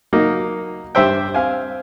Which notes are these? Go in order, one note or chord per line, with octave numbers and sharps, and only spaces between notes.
F#3 A#3 D#4
G2 G4 C5 E5 G5
C4 F5 G#5